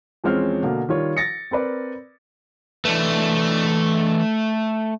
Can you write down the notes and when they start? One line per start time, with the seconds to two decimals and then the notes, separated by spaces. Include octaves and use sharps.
0.24 E2 F3 G#3 C4 C#4 F6
0.63 B2 D3 A#3
0.89 D#3 G3 F4 C#5
1.17 A6 A#6 C#7
1.51 C4 A#4 B4 D5
2.85 E3 A3 D4 B4